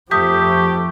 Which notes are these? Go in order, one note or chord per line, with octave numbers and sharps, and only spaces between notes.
F2 F3 A3 G4 D#6 G6 B6